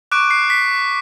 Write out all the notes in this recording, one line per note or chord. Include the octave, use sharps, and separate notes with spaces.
C#6 D6 F#6 D7
C7
B6